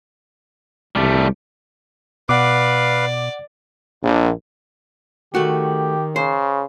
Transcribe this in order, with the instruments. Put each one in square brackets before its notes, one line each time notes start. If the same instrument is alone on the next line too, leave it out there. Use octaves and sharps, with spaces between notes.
[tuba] C2 [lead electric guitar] G3 A3
[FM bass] B2 [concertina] B4 F5 [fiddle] D5 [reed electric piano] F#5 D6
[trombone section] A#1
[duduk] D#3 [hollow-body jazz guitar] A3 F#4 [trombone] G4
[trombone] C#3 [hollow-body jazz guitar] C5